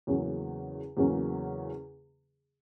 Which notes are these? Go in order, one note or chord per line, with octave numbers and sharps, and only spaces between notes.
E2 C#3 F#3 A#3 C#4
E2 C#3 F#3 A#3 C#4